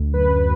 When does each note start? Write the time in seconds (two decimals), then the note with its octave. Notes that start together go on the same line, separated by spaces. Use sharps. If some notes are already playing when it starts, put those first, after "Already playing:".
Already playing: D2
0.13 F#2 B4